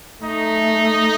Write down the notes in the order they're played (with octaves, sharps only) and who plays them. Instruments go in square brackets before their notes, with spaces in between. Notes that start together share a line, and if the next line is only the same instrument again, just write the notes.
[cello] A3 [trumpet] D#4